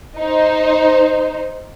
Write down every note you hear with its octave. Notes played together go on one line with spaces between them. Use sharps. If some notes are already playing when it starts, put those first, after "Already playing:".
D#4 C5